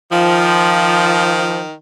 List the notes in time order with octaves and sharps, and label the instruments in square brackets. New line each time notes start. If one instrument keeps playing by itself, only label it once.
[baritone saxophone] D#3 [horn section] F3